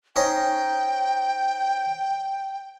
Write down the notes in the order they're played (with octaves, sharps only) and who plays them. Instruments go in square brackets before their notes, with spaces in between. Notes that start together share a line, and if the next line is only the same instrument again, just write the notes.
[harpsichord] C#4 D#4 C5 [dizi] G5